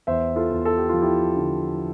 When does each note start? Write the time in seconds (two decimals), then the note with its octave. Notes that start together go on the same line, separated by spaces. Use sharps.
0.07 E2 C5 E5
0.36 F4 A4
0.50 E2
0.65 A4
0.78 G4
0.89 F3 F4
1.02 E4 G4
1.36 D3